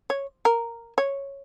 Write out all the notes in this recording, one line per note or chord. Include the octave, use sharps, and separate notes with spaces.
C#5
A#4
C#5